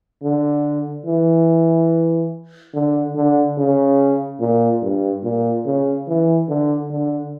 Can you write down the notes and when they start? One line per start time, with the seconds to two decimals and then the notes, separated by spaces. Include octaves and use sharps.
0.22 D3
1.06 E3
2.74 D3
3.15 D3
3.57 C#3
4.40 A#2
4.82 G2
5.23 A#2
5.66 C#3
6.08 E3
6.49 D3
6.90 D3